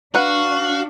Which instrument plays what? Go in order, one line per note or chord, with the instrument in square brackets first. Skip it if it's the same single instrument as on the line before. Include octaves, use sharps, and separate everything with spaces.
[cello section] D4 [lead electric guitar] F#4 [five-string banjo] B4 F#5 [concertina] F5